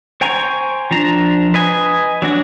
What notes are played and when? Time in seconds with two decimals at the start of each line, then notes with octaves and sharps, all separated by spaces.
0.21 C5 G5 G#5 A#5 C#6
0.91 F3 D4 A#5
1.54 B4 D#5 G#5
2.22 F#3 D4 F#4